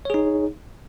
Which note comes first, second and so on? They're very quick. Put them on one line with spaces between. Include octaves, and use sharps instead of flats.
C#5 G#4 D#4